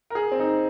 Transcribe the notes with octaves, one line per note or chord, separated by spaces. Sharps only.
A#4
G#4
C4
D#4